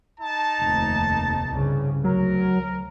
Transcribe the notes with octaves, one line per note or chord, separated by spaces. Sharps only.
D#4 A5
F1 D#2
C2 G2 C#3
D2 F#3 A#4